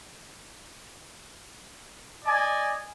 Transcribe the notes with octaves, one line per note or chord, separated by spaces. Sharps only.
D5 D#5 G#5